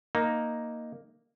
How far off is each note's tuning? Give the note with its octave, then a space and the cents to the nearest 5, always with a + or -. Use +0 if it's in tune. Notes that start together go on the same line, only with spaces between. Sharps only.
A#3 +0 D#4 +0